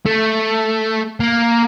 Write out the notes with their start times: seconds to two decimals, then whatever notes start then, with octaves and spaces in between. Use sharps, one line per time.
0.06 A3
1.20 A#3